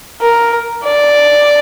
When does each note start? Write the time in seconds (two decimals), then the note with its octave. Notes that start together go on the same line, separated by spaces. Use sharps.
0.21 A#4
0.84 D5